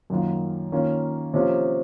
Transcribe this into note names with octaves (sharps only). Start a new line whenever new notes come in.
F#2 D#3 A#3 F4
D#3 A#3 C#4 F4
C3 F3 A#3 C#4 F4